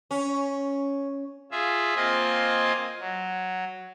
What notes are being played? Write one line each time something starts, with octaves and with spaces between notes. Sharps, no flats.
C#4
F4 G#4 E5
A#3 C4 F4 D#5 G#5
F#3